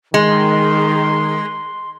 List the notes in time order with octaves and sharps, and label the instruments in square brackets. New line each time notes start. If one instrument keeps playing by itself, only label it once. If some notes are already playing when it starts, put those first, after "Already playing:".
[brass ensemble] D#3 [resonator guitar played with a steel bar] G#3 [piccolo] C6